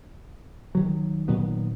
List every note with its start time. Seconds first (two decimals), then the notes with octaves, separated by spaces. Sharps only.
0.75 D#3 F#3
1.28 A#2 D#3 F#3 B3